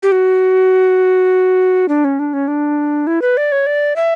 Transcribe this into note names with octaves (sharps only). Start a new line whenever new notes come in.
G4
F#4
D4
C#4
D4
C#4
D4
E4
B4
D5
C#5
D5
E5